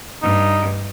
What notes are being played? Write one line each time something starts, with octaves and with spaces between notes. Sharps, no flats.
G2 D#4